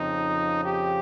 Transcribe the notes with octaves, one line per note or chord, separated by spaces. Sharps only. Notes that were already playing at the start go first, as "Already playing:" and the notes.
Already playing: F2 C#3 F3 C4 D#4
G4